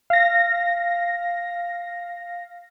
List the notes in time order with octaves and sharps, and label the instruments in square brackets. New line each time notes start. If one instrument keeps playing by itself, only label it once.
[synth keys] F5 A#6